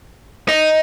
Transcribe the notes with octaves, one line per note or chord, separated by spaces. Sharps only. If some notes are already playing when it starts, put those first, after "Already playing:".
D#4